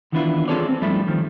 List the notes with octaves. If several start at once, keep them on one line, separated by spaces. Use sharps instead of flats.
D#3 E3 B3 D4 E4 F4
C4 F4 G#4 A4 C#5 D5
C4
G2 F3 G3 A3 E4
D#3 F3 G3